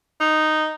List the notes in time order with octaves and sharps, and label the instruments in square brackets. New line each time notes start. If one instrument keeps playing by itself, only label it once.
[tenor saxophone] D#4